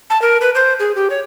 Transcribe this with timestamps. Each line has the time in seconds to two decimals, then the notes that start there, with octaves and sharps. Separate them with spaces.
0.10 A5
0.22 A#4
0.41 B4
0.55 C5
0.80 G#4
0.96 G4
1.10 C#5